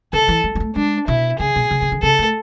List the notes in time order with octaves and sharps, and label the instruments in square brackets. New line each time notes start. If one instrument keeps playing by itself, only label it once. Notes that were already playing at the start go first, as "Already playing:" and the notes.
[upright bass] D3 [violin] A4
[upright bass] E3
G#3
G#3
A3
[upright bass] G#3 [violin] D4
[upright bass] B2 [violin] E4
[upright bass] C#3 [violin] G#4
[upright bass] B2
C#3
C#3
D3
[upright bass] C#3 [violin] A4
[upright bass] A3